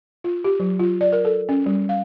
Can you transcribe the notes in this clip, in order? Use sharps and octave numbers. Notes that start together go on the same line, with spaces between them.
F4
G4
F#3
F4
D5
A#4
A4
C#4
G3
F5